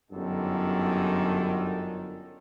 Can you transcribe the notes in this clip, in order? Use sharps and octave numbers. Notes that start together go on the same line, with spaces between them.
G1 F#2 D3 D#3 A4